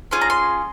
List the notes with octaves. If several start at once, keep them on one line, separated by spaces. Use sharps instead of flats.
C#4 F4 G#4 C6
A#5
C6